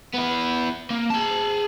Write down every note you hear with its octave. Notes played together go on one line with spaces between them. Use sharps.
B3 E4
A#3
G#4 A5